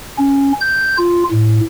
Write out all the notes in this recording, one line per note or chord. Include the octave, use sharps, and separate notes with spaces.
C#4
G6
F4
A2